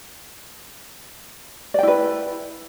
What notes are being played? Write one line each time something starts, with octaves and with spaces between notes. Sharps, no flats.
E4 B4 D5 G5